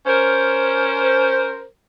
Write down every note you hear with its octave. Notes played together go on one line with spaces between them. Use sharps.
C#4 A#4 C5